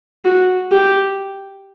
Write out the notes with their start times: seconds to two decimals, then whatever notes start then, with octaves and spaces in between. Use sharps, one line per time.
0.25 F#4
0.71 G4